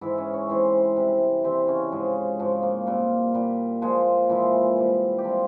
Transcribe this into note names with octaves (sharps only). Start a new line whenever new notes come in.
G#2 E3 G#3 E4 E5
C#4 C#5
C#4 C#5
G#2 E3 G#3 C4 C5
C3 E3 G3
C3 E3 G3 C4 C5
C#3 C#4
G#2 F3 G#3
G#2 F3 G#3
A#3
A#2 G3 C4
A#2 G3
A#2 F3 G#3
A#2 E3 F3 G#3 E4
C3 G3
G4
C3 F3 G3 F4